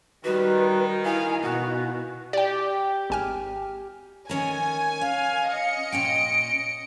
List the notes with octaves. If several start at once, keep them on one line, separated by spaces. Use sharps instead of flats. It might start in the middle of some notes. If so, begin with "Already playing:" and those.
D#3 G3 F#4 B4
E4 F5 G#5
B2 F#4
G4 D5 G5
G#1 G#5 F6
D#3 C#4 A#4 G#5
C#4 F5
D#5 C#7
A#2 C#4 G5 D7